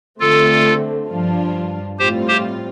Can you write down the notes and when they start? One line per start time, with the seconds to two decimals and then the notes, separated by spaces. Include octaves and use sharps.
0.20 D3 A3 C4 F4 A4
1.09 G2 F3 D4 F4
1.98 A2 G3 C4 F4 G4 C5
2.28 G4 C5